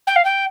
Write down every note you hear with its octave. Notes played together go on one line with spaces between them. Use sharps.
G5
F5
G5